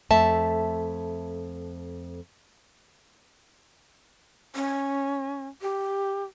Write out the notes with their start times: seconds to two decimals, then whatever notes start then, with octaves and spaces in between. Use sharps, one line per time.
0.11 F2 A3 E5 A5
4.55 C#4
5.62 G4